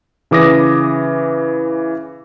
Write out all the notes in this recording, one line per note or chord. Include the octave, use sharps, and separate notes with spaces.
C#3 E3 D6 D#6 A#6